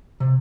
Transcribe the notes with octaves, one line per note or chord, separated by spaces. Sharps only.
C3